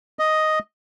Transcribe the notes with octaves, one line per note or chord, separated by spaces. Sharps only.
D#5